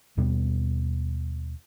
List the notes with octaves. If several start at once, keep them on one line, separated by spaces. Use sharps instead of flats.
D#2 B2 G3 B3